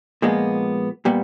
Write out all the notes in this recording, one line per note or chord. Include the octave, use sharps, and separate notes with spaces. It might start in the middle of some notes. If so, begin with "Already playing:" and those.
A#2 F3 G#3 B3
A#2 G3 B3